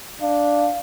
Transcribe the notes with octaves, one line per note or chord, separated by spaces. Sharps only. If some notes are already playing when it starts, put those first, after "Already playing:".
D4 F5